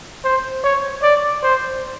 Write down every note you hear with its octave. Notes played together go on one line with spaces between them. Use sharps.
C5
C#5
D5
C5